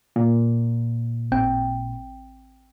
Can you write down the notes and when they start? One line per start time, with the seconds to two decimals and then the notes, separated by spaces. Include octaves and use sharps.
0.16 A#2
1.32 A1 C4 G5